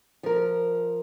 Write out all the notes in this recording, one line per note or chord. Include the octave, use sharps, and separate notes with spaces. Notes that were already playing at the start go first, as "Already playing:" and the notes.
F3 A#4